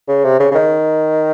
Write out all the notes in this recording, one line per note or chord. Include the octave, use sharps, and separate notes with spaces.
C#3
C3
C#3
C#3
D#3